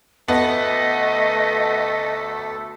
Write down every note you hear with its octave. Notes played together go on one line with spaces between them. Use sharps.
D2 A3 B3 A4 D#5